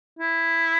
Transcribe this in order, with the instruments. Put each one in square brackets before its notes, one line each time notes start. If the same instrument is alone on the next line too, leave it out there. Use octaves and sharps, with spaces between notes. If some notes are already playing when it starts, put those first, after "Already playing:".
[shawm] E4